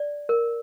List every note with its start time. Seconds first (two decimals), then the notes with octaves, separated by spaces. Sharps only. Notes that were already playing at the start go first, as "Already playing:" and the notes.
Already playing: D5
0.29 A#4